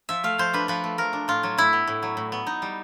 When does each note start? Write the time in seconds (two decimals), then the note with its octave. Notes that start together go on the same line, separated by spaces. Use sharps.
0.09 F3 E5
0.24 A3 F5
0.38 F3 C5
0.53 D4 B4
0.68 F3 B4
0.84 A3
0.98 F3 A#4
1.13 D4
1.28 A2 F4
1.43 F#3
1.58 A2 E4
1.73 B3
1.88 A2
2.03 F#3
2.17 A2
2.32 B3
2.47 D#4
2.62 G3